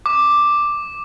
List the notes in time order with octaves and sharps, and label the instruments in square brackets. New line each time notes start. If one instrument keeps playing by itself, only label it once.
[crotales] D6